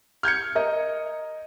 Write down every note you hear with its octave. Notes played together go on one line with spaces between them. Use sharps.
F6 G6 G#6 C#7
A#4 D#5